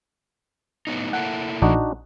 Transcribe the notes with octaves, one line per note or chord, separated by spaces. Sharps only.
A2 B3 D#4
A#3 E4 A4 F#5
A#1 D4 D#4 F#4